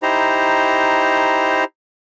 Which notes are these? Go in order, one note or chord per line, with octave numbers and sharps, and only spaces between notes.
D#4 E4 G4 C5 A#5